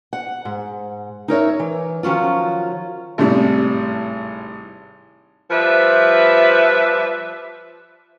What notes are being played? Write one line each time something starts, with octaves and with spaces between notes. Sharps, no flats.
F#5
G#2
D#4 A#4 C#5 E5
E3
D#3 F3 F#3 C#4 F4
G#1 A2 C3 G3
F3 G3 B4 E5